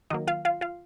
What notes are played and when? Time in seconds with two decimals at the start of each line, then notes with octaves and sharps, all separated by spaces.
0.10 D#3 F#3 A#3 D#4 D#5
0.27 F4 F5
0.45 F4 F5
0.61 F4 F5